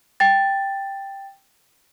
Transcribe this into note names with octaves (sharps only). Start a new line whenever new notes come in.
G5 A6